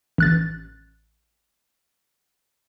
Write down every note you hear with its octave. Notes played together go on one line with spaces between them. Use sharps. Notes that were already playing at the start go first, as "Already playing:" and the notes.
A1 F#6 A6